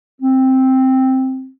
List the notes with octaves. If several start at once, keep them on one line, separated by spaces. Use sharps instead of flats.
C4